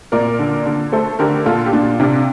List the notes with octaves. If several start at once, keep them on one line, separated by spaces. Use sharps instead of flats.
A#2 A#4 D5
D3
D3
A3 A4 C5
D3 G4 A#4
A#2 F4 A4
G4
A#2 D4 F4
C3 D4 F4